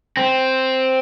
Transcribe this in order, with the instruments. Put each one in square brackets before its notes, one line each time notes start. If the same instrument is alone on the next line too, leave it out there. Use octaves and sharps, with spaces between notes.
[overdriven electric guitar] C4